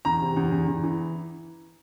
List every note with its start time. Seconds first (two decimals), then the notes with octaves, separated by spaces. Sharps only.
0.05 E2 A#5
0.21 C3
0.36 E2
0.51 E2
0.68 E2
0.83 E3